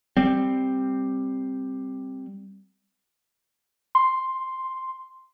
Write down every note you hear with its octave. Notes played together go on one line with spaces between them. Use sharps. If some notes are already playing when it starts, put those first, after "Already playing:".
G3 C4
C6